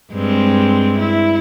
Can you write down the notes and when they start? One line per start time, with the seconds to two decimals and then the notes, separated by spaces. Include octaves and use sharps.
0.12 G2 G#3 C4
0.99 E4